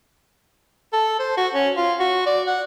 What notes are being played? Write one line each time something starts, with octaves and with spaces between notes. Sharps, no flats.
A4
C5
F#4
C#4
F4
F#4
D5
F#5